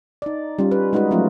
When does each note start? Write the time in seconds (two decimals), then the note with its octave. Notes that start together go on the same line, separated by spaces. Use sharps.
0.22 D#4 D5
0.59 G3 C#4 F4
0.71 B4
0.93 G#3 D#4 F#4 G#4 B4
1.11 F3 F#3 A3 C#4 F4